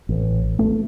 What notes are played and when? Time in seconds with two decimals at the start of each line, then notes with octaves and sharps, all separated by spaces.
0.09 A1
0.59 A3